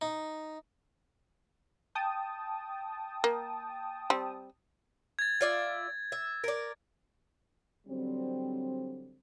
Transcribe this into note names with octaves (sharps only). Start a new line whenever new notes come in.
D#4
G5 A5 D#6
A#3
G3 C4
G#6 A6
F4 D5 E5
E5
A#4 D5
D3 F#3 G3 C4